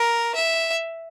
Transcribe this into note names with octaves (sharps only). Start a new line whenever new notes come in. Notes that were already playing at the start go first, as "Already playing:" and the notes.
Already playing: A#4
E5